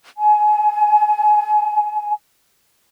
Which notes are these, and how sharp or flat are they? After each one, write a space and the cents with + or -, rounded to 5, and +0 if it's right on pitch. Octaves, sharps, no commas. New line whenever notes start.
G#5 +25